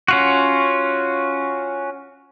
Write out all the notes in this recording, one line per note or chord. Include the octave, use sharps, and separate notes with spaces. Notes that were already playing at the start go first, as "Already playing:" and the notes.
C#4 F4 F#4